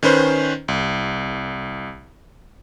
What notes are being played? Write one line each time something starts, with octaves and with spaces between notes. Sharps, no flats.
D#3 C#4 B4 C5
C2